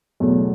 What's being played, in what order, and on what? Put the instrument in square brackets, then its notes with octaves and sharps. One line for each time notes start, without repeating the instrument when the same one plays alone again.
[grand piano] E2 B2 F#3 A3